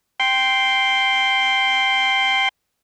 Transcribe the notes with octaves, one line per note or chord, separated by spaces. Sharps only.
G5 C6